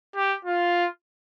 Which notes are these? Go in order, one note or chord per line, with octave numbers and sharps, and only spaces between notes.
G4
F4